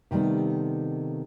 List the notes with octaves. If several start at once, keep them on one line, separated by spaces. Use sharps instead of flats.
C3 D#3 G3 A3 B3